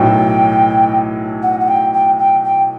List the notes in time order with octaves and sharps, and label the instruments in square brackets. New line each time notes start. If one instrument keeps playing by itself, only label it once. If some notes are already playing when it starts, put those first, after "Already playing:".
Already playing: [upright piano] B1 A2 F#3 A3 [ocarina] G5
[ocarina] F#5
F#5
G5
G5
G5
G5